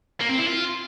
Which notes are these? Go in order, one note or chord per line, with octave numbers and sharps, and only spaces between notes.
A#3
C4
E4
F4